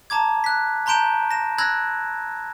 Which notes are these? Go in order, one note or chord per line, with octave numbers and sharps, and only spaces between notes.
A5 A#5 D6 G#6
F#6 B6
A5 A#5 C6 G6 D7 E7
A#6 E7
B5 E6 F#6 G#6 A#6